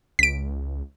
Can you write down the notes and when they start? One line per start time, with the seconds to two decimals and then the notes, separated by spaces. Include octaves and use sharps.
0.19 C#2 B6 D7